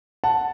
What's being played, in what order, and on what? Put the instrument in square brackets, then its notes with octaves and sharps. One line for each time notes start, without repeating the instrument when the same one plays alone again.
[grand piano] F#5 A5